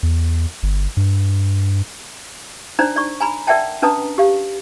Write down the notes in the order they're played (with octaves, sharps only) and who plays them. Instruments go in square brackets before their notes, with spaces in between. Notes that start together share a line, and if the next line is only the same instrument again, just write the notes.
[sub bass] E2
G1
G2
[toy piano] D4 D#4 C5 D5 A#5
D5 C#6
G#5 A#5 B5
A#4 D5 E5 F#5 G5 A5
C#4 D4 B4 A5 A#5 D#6
G4 F5